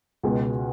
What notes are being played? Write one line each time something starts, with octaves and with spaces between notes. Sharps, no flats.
C#2 B2 G#3